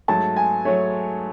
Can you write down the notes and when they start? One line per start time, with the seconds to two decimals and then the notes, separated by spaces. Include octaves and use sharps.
0.08 G#2 F#3 A3 A5
0.36 G#5
0.65 F#3 A3 C#5